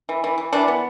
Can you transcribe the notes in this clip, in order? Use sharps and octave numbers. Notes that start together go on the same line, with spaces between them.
E3
E3
E3
E3 D4
B3